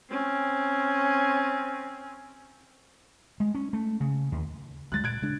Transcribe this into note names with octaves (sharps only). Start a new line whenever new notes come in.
C4 C#4
G#3
C#4
A3
C#3
D#2
D2 G3 G#3 F#6 A6
A#2 F#6 G#6 D7
C#3 G#3 D4